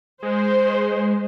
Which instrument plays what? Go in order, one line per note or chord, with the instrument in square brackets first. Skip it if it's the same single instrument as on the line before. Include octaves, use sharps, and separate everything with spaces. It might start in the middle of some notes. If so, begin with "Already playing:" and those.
[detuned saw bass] G#3 [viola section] C5